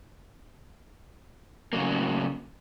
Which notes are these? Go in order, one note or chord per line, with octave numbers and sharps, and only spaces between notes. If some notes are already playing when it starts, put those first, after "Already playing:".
A2 C#3 F#3 A#3